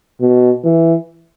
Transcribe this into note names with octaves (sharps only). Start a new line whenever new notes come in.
B2
E3